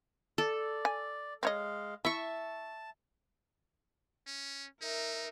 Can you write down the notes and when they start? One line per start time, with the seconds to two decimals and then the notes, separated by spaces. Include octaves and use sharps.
0.38 A4 D5
0.85 G#5
1.43 G#3 C4 C#5 D#5 F5
2.05 E4 E5 A5 C#6
4.27 C#4
4.81 D#4 A#4 E5